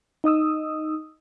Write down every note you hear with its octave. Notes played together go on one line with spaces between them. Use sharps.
D#4 D#5 D#6 E6